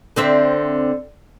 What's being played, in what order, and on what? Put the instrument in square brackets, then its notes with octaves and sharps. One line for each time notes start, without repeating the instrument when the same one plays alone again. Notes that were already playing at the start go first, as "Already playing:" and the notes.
[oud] D3 C4 E5